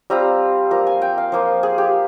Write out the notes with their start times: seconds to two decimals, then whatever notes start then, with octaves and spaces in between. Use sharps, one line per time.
0.10 G3 C4 F4 A#5
0.71 F3 A#3 F4 A#5
0.87 G#5
1.02 G5
1.18 F5
1.32 F3 A#3 F4
1.63 G#4
1.78 G4